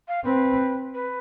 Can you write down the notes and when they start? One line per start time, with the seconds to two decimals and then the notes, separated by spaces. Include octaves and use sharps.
0.08 F5
0.25 C4 B4
0.94 B4